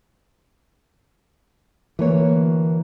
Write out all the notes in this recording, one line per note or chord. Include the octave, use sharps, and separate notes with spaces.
D2 E3 A#3 C#5